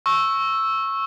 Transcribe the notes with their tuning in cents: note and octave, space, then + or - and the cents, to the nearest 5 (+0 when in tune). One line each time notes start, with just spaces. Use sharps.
C#6 -15 E6 +0